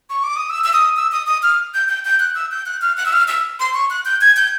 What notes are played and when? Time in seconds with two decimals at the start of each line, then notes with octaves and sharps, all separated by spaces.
0.10 C#6
0.24 D6
0.36 D#6
0.50 E6
0.64 E6
0.73 D#6
0.97 E6
1.12 D#6
1.27 D#6
1.43 F6
1.74 G6
1.89 G6
2.05 G6
2.20 F#6
2.35 E6
2.51 G6
2.66 F#6
2.82 F6
2.97 F#6
3.06 E6
3.13 F6
3.28 E6
3.60 C6
3.74 C#6
3.90 F#6
4.05 G6
4.21 G#6
4.37 G6